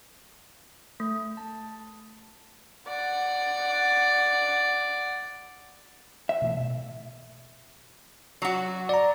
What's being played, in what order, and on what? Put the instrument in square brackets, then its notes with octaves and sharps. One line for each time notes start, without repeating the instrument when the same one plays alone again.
[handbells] A3
A5
[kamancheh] D5 F#5
[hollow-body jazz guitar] E5
[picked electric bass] B2 E3 A3
B2
[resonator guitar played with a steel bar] F#3 F#4
[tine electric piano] D5 A#5